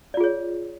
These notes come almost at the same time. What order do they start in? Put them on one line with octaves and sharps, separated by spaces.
D5 F4 G#4 C#5